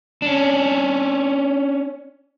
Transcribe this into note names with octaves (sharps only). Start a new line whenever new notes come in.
C#4 D4